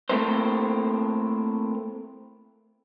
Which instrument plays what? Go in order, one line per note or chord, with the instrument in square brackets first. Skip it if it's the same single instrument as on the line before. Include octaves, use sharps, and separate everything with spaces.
[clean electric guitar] A3 A#3 C4 E4 A#4 C5